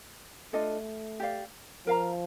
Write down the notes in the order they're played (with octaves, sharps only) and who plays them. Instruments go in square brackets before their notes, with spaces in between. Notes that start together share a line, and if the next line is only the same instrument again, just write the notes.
[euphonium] A3 [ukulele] D4 F4 A4 D#5
[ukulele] G4 D5 F5
[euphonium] F3 [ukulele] A#4 F5 A#5